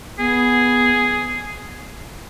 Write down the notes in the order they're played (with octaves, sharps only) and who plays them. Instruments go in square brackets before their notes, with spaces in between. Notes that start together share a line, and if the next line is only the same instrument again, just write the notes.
[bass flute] B3 [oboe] G#4